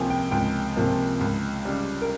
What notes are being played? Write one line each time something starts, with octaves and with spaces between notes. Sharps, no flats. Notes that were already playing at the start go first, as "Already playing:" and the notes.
Already playing: C#2 C3 F3 A#3 G5 G#5
G5
C#2 G5
C3 F3 A#3
C#2
C#3 G3
A#4